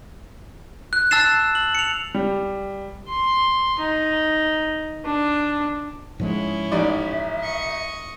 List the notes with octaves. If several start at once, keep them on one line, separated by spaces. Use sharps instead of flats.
F#6
A5 E6 F#6 A6 C7 E7
F#7
C#7 F7
G3
C6
D#4
D4
G#2 F3 G#3 C#4 E4
A1 D#4 D5 E5
D#5 C#6